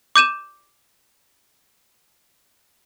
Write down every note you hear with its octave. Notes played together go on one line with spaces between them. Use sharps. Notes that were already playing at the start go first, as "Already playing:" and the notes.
D6 G6 D#7 E7